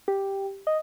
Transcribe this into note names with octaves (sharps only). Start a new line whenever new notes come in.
G4
D#5